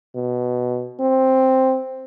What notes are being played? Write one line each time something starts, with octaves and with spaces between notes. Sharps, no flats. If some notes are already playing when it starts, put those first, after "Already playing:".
B2
C4